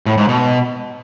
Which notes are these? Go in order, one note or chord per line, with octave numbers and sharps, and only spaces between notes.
A2
G#2
B2